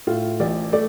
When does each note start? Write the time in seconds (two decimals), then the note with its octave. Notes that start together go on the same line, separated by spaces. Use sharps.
0.07 A2 F4
0.40 A1 D5
0.72 A3 D5